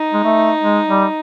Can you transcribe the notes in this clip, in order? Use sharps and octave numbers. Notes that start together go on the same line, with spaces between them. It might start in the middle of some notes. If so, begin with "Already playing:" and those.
Already playing: D#4
G#3
A3
G#3
G3